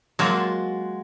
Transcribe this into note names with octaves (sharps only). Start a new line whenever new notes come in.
F#3 G#3 A#3 F4 F#4 A5